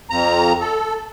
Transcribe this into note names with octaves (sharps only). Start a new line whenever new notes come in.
F2 A#5
A4